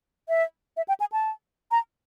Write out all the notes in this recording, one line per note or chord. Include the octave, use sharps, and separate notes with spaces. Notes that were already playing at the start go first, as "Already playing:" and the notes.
E5
E5
G5
G#5
A5
A#5